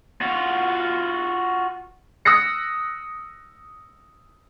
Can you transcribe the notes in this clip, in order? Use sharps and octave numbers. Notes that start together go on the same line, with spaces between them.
F4 F#4
D#6 E6 F#6 A#6 C#7